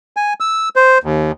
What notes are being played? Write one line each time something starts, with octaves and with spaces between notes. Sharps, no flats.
G#5
E6
C5
D#2